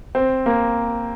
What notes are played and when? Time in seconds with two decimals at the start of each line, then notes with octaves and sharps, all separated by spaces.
0.15 C4
0.46 A#3